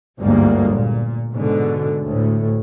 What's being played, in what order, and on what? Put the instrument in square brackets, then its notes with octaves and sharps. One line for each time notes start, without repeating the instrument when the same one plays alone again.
[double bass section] G1 D2 G#2 G3 G#3 A#3
A#2
G#2 B2 D3
D2 A2